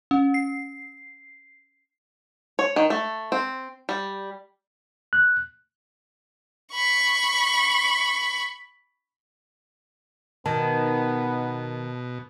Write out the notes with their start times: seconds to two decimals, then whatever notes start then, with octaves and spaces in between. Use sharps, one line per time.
0.11 C#4
0.34 C7
2.59 C#5
2.76 D#3
2.90 A3
3.32 C4
3.89 G3
5.13 F#6
6.72 B5 C#6
10.46 B2 D#3 B3 A5 G#6